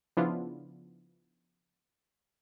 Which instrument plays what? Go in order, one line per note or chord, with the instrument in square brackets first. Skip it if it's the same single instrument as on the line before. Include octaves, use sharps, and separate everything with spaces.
[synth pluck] C#3 F3 B3 D4 E4 F4